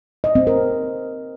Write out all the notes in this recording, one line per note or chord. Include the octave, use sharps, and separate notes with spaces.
D#5
C4
A#4